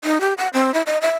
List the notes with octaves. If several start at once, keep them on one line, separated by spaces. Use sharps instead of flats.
D#4
G4
F#5
C4
E4
D#5
E5